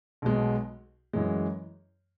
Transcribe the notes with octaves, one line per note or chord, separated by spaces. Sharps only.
B1 B2 G#3
F#2 E3 G#3